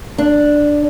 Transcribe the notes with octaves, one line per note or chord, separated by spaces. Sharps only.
D4